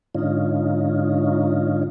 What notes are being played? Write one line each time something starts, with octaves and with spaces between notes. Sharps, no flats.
G#2 D3 C#4 D#4 F4